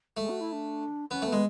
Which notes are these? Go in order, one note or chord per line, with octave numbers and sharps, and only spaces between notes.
G#3 A3
F#4
E4
D4
B3 C#4
A3
B3
G#3